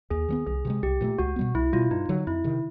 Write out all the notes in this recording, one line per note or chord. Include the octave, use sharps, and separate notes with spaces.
D#2 G#4
D#3 G3 B3
C2 G#4
C3 E3
G#3
C2 G4
A#2 F3 A3
C#2 F#4
B2 G3 B3
C2 E4
B2 G3 F4
G2 D#4
D3 F#3
F2 E4
C3 D#3